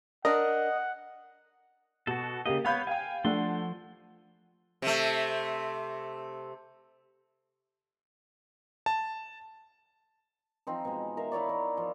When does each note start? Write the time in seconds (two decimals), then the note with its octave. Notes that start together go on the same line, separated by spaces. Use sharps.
0.25 D4 A#4 D#5 F#5
2.07 B2 F#4 A4
2.46 C#3 A#3 G4 D#5
2.65 B3 C#5 F5 B5 G6
2.87 F5 G5 G#5
3.24 F3 A3 D4 A4 F#5 C6
4.82 C3 A3
8.86 A5
10.67 F3 C4 D#4
10.85 B2 G#3
11.17 A#4 E5 F5
11.32 D#4 E4 C#5 D5
11.49 A#4
11.77 F3